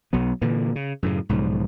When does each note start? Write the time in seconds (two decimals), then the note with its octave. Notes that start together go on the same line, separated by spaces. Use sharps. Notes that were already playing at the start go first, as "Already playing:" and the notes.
0.13 B1 F#3 B3
0.41 A#2 D3 E3
0.76 C#3
1.03 F#2 A2 C#3
1.29 B1 G#2 C#3 F3